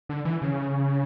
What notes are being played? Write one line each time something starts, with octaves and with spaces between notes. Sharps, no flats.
D3
E3
C#3